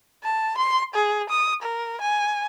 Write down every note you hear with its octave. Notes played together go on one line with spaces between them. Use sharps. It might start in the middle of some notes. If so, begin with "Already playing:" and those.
A5
C6
G#4
D#6
A#4
G#5